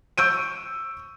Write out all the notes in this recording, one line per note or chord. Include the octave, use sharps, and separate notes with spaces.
C#6 E6 G6 D7 D#7